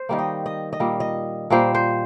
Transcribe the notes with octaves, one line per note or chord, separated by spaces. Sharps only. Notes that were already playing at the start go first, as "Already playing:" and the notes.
Already playing: C5
D#3 G3 A#3
D#5
D#5
D#5
A#2 G3 A#3
D#5
A#2 G3 A#3 C5
C5